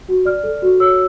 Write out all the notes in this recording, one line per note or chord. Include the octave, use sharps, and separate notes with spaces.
F#4
D5 F6
A4
F#4
C#5 E6